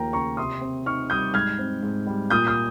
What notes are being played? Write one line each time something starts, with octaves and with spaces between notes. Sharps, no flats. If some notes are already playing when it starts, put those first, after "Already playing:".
Already playing: D#2 F3 A#3 A#4 G5 A#5
C#3 A#5 C#6
C3 C6 D#6
C4
D#4 C#6 F6
G3 D#6 G6
G#2 F6 G#6
C4
G#2
G3
A#2 D#6 G6
D#6 G6